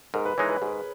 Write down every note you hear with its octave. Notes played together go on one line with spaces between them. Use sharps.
G#2 A#4
B4
E3 G#3 D#4 C#5
B4
G#2 G#4